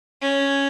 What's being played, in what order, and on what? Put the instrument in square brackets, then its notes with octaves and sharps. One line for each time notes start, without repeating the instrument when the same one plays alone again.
[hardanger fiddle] C#4